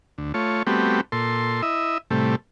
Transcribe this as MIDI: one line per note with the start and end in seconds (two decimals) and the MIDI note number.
0.18 0.32 38
0.34 0.63 57
0.34 0.63 65
0.34 0.63 73
0.67 1.01 55
0.67 1.01 57
0.67 1.01 59
0.67 1.01 60
0.67 1.01 66
0.67 1.01 67
1.12 1.62 46
1.12 1.62 69
1.12 1.62 84
1.62 1.98 64
1.62 1.98 75
1.62 1.98 76
2.11 2.36 45
2.11 2.36 48
2.11 2.36 55
2.11 2.36 57